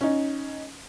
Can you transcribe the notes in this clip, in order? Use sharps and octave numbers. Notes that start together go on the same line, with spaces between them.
C#4 D#4